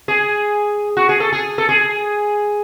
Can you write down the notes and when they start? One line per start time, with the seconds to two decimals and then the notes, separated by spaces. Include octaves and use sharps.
0.08 G#4
0.97 F#4
1.09 G#4
1.20 A4
1.32 G#4
1.58 A4
1.69 G#4